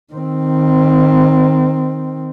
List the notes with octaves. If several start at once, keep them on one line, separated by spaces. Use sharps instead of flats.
D#3 C4